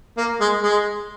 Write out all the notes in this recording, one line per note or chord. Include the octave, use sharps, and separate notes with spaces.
A#3
G#3
G#3